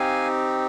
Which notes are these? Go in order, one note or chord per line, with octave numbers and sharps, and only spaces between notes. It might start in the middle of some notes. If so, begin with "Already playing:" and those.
Already playing: C4 D#4 G4 F5 G#5